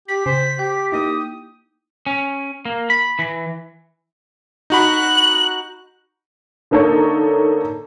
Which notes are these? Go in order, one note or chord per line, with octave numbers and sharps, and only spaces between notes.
G4 B6
C#3 C5
G4 G5
A#3 D#4 E4 D#6
C#4
A#3
B5
E3
D#4 F#4 B5 F#6
D3 A#3 D#4 A4 C#5